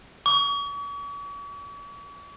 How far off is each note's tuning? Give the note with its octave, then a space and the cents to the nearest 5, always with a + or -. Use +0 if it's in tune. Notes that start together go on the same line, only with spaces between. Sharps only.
C#6 +45